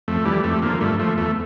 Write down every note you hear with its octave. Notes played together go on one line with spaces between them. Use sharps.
F2 A3
E3 G3
F2 A3
D3 F3 A#3
G2 A3
F3 A3
E2 A3